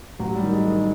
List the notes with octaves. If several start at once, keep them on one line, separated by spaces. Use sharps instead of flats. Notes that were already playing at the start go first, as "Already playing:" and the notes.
A1 F#3
G3
D#3
G#3
D#3 G#3